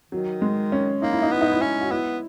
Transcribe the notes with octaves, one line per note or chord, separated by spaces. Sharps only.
D#3 F#3
G#3
C#4
A#3 D#4
E4
D#4
B3 E4
D#4
E4
C#4 D#4
F#4
B3 E4